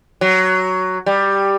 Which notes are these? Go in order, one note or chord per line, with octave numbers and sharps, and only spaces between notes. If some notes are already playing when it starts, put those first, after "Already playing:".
F#3
G3